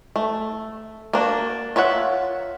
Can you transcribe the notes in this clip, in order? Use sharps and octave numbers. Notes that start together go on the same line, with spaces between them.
A3
A#3 D4 F#4
F4 C#5 E5 F#5